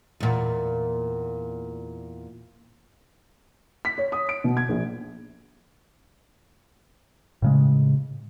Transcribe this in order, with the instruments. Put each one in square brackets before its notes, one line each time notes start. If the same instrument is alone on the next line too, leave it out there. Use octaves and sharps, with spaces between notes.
[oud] E2 A#2
[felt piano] B6
C#5
D#6
D7
B2
G#6
A#1
[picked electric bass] A2 C#3 G#3